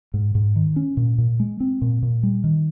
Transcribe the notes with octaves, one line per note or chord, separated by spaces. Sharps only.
G#2
G#2
D#3
C#4
A#2
A#2
G#3
C4
A#2
A#2
G3
D#3